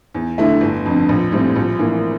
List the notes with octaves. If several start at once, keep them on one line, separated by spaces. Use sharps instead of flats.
E2
D3 A3 E4
G1
F2 D3
A#1
A2 G3 C4
A#1
A2 E3 A#3